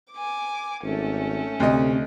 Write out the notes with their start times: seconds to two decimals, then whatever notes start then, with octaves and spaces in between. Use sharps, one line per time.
0.12 G#5 D6
0.83 G#1 A3 C#4
1.60 D2 C3 D#5